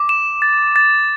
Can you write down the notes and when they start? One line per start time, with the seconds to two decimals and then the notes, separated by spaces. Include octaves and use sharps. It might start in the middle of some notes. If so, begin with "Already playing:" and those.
Already playing: D6
0.09 E7
0.42 A6
0.76 A6